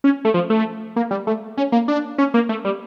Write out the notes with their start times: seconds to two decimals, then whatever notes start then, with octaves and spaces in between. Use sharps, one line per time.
0.04 C#4
0.25 A3
0.34 F3
0.50 A3
0.96 A#3
1.11 G3
1.27 A3
1.57 C#4
1.72 A#3
1.88 D4
2.18 C#4
2.34 A#3
2.49 A3
2.65 G3